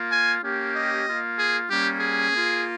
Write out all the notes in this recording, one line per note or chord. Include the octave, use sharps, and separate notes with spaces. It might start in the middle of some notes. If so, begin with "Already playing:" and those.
Already playing: A#3 F4
G#5
A#3 C#4 G4
D#5
A#3 F4
G#4
G3 A#3 C#4 G4
G#4
A#3 F4